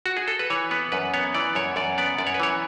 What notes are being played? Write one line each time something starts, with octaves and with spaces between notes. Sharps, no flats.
F#4
G#4
A4
B4
E3 C#5
B3 B4
F#2 B4
B3 C#5
E3 D5
F#2 C#5
F#2 D5
B3 D5
F#2 D5
C#5
B4
E3 C#5